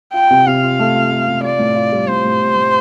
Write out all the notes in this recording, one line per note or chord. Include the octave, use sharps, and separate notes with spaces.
F4 G5
C3
C3 F5
F4
A3
F4
A3
C3
F4 D5
A2
F4
G3
A2 C5
A2
A2
A2